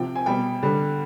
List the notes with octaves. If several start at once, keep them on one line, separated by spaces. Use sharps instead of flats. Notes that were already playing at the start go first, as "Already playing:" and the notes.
Already playing: C3 F3 G5
G#5
B2 G3 G5
D3 G3